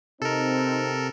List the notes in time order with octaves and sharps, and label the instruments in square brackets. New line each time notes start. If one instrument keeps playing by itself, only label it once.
[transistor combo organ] C3 [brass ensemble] C4 D#4 [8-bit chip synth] A4 A#4